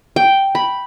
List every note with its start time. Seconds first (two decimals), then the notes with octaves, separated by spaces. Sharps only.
0.16 G5
0.55 B5